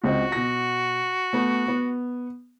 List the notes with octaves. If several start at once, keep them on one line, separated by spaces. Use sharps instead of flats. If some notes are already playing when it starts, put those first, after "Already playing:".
C#2 C4 F#4 D#5
B2 A#6
A3 B3
B3